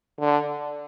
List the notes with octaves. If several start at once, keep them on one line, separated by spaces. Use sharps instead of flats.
D3